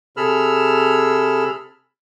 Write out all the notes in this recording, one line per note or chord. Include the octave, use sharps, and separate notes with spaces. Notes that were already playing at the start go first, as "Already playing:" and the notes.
C3 G#4 A4 B5 E6 F6